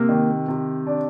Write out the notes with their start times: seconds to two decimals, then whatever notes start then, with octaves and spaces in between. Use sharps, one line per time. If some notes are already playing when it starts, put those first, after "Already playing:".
Already playing: C3 A#3
0.09 D#3
0.48 C3
0.87 D4